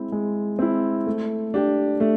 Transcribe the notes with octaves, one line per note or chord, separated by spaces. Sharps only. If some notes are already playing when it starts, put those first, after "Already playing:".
Already playing: G#3 C4 E4
G#3
C4 E4
A3
D4 G4
A3